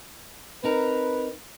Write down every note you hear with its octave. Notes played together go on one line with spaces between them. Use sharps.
C4 D#4 A#4 B4